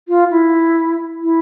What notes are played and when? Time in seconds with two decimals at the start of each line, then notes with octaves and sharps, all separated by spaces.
0.08 F4
0.31 E4
1.23 E4